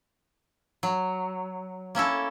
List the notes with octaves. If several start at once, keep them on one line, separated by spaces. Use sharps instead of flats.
F#3
A#3 C#4 E4 A4